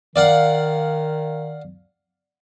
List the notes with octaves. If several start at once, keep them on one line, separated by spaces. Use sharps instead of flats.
D#3 D5 F5 F#5